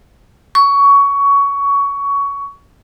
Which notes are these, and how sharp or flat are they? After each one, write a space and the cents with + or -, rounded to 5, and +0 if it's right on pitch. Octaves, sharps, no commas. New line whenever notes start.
C#6 +20